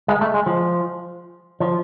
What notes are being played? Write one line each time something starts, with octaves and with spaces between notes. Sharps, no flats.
G#3
A3
G#3
F3
F3